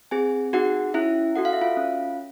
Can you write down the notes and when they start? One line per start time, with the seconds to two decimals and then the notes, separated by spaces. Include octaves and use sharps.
0.11 C4 G#4 G#5
0.53 D#4 F#4 G#4 F#5
0.94 C#4 E4 E5
1.36 F#4 A4 F#5
1.45 F5
1.53 E5
1.61 F4 F5
1.77 C#4